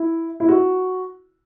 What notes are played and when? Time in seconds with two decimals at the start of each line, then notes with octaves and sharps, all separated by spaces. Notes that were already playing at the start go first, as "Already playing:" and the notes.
Already playing: E4
0.40 E4
0.48 F#4